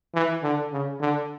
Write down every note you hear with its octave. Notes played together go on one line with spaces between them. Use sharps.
E3
D3
C#3
D3